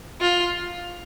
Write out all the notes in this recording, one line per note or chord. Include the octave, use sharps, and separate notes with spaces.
F4